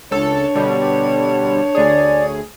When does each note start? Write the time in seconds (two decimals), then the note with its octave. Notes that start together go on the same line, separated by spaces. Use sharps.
0.11 C#2 D4 A4 C#5
0.55 B2 D3 G3
1.75 D2 G#4 D5